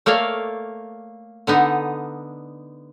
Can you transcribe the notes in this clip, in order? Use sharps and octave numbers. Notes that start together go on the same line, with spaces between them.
A3 A#3 C#5 D5 F5
D3 B3 D#4